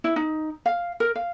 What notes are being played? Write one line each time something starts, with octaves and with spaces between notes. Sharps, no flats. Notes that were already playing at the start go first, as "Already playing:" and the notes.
E4
D#4
F5
A#4
F5